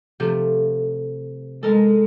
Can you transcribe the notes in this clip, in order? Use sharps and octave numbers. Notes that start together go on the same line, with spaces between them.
C3 F3 A3
G#3 A4 A#4